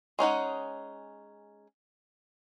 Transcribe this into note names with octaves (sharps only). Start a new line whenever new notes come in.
G#3 C#4 D#4 F#5